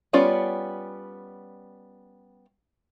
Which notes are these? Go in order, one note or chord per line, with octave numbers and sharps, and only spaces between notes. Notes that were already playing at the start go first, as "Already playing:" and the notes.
G3 B3 C#4 F4 D5